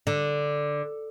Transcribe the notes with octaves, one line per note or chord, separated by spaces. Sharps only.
D3